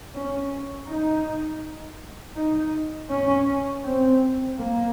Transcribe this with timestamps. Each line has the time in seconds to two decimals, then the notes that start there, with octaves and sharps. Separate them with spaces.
0.14 C#4
0.87 D#4
2.35 D#4
3.09 C#4
3.84 C4
4.58 A#3